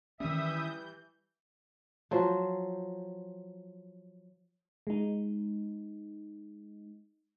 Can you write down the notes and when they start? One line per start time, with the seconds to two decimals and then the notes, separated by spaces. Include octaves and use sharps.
0.20 D#3 E3 G3 C#4 E5 D#6 G6
2.11 F3 F#3 C5
4.87 G#3 D#4